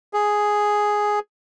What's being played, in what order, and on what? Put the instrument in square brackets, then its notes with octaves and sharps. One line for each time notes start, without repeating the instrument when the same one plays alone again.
[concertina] G#4